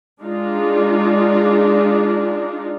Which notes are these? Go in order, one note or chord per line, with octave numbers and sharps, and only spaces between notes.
G#3 D4 D#4 F4